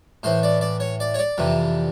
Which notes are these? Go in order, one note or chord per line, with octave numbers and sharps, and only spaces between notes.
A2 E3 C5
D5
D5
C#5
D5
C#5
D5
F2 C3 E3